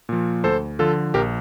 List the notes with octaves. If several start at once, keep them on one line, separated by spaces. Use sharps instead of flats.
A#2 F3
D2 A4 C5
D3 F3 F4 A4
A#1 G4 A#4